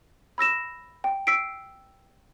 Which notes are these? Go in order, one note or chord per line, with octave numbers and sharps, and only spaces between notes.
B5 E6 A#6 E7
G5
E6 B6 C7 D7